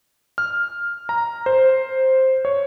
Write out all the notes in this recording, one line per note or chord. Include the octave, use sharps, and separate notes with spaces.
F6
A#5
C5
C#5